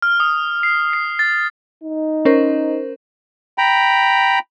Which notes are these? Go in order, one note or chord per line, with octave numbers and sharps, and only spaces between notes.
F6
D#6
C7
C7
A6
D#4
C#4 A#4 C5
G5 A#5 B5